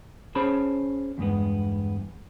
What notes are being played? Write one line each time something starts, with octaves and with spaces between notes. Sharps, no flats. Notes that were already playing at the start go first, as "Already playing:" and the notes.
C#4 G#4 C5 C#5 A5 B5
E2 G2 G#3 B3